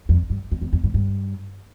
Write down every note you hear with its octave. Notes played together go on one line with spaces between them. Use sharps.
F2
G2
F2
E2
F2
G2
G2